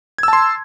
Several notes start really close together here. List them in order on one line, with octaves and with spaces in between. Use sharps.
G#6 E6 A5 C6